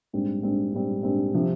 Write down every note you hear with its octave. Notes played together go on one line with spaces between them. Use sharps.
A#1 G#2 G3 C4
A#1 G#2 G3 C4
A#1 G#2 G3 C4
A#1 G#2 G3 C4
C3 F3 C4